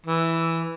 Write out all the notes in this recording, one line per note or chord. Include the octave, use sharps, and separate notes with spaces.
E3